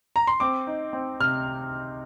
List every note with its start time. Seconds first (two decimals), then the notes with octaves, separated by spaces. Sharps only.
0.16 A#5
0.27 C6
0.40 C4 D6
0.67 D#4
0.93 C4
1.20 C3 F6